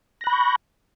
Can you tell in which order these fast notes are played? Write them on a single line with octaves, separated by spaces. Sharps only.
A#6 F#6 B5 G6 C#6